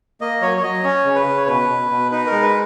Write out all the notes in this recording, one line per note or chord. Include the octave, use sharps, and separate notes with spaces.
A#3 D#5
F#3 C#5
C#5
F#3 D#5
C#4 C#5
C#3
B4
C#3
C#5
B2 B4
B2
B2
D#4 B4
A#4
G#3
B4